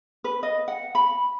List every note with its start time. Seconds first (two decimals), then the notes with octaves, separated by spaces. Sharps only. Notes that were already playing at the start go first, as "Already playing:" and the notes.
0.24 B4
0.43 D#5
0.68 F#5
0.95 B5